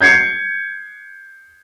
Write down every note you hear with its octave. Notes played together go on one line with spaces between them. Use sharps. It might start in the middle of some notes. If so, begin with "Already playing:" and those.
G6 G#6 C7 C#7